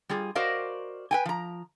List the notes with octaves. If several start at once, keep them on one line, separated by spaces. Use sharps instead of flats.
G3 F4 G#4
F#4 A#4 C5 D5 D#5 F5
B4 G5 G#5
F3 A#5